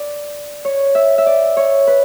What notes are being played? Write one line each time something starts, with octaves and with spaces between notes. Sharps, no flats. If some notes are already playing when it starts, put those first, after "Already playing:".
Already playing: D5
C#5
E5
E5
D5
C#5
B4